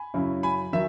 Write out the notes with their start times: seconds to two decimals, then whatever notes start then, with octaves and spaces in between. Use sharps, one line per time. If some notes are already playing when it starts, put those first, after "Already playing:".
Already playing: G#5 B5
0.14 F#2 C#3 F#3 C#4 E4
0.43 G#5 B5
0.73 D#3 F#3 E5